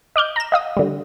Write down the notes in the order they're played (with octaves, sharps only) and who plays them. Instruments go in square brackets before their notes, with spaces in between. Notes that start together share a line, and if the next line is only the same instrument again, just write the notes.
[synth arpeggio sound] D#5 D6 F6 G6
A#5 E7
D#5 F5 D#6
D3 G3